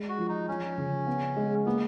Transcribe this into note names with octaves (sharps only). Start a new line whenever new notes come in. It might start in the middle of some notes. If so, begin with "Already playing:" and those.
Already playing: G#3
F#4
F3
D#4
F3 C#4
C#3
B3
G#3
A#3 B3